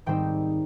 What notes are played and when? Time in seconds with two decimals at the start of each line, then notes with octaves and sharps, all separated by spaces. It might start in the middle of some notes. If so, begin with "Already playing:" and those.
0.06 G#2 D#3 G3 C4 D#4 G5